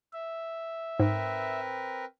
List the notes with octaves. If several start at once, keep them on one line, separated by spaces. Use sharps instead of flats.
E5
G#2 C4 A#4 B4